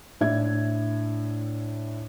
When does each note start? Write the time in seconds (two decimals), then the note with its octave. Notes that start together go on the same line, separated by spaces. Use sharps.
0.21 A2 D4 E5 G#6